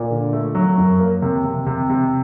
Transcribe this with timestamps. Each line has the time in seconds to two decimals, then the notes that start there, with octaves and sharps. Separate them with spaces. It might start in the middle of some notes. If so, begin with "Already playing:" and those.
Already playing: A#2
0.10 D3
0.33 A3
0.55 F#3
0.78 F#2
0.99 A#3
1.22 C3
1.45 C3
1.66 C3
1.90 C3